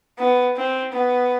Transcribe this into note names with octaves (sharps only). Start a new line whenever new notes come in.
B3
C4
B3